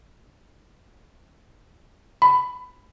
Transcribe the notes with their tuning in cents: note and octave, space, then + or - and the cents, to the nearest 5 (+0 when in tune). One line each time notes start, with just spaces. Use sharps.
B5 +15